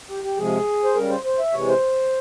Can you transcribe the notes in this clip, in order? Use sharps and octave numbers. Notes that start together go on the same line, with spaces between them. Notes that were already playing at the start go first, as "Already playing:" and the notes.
G4
G4
C3 F3 G#3 G#4
C5
C#3 G3 A#4
C5
C5
E5
C3 E3 G#3 C#5
C5